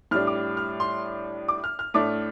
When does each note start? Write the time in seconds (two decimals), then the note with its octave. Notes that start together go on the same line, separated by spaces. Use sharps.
0.11 A2 F6
0.14 G3 D4
0.27 D6
0.57 F6
0.80 C6
1.48 D6
1.64 F6
1.79 F6
1.94 A2 A3 D4 D6